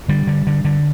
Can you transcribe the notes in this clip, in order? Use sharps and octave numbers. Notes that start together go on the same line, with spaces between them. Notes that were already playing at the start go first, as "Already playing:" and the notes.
D3 G3
D3
D3
D3